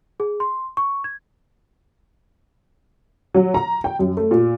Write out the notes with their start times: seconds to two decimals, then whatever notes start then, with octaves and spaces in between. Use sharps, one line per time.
0.20 G#4
0.40 C6
0.77 C#6
1.04 G#6
3.35 F#3
3.54 A#5
3.84 G5
3.99 F#2
4.17 A3
4.31 A#2